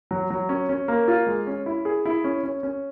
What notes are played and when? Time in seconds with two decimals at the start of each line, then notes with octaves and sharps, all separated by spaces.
0.11 F#3
0.30 F#3
0.49 C#4
0.69 C#4
0.88 A#3
1.08 F4
1.27 G#3
1.47 C#4
1.66 E4
1.85 G#4
2.05 E4
2.24 C#4
2.44 C#4
2.63 C#4